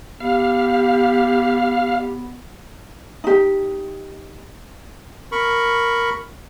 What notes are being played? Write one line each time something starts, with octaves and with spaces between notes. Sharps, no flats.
B3 G4 F5
D#4 G4
A#4 B5 C#6